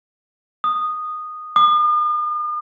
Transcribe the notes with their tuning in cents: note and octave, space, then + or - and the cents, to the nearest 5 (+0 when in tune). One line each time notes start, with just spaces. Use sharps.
D#6 -10
D#6 -45